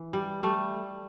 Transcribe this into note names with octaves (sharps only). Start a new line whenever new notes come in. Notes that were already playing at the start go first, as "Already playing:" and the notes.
Already playing: E3
G3
G3 A3